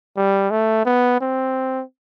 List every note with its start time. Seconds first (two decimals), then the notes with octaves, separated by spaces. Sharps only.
0.17 G3
0.51 A3
0.85 B3
1.21 C4